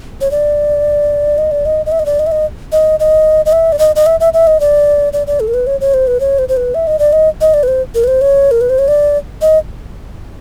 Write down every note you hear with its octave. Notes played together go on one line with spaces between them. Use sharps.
C#5
D5
D#5
D5
D#5
D#5
E5
D#5
D5
D#5
E5
D#5
D#5
D#5
D#5
E5
D5
D#5
D#5
E5
E5
E5
D#5
D5
D5
D5
A4
A#4
B4
C#5
C#5
C5
B4
C#5
C5
C5
B4
E5
D#5
D5
D#5
D#5
D5
B4
C5
A#4
B4
C5
C#5
A#4
B4
C5
C#5
D5
D#5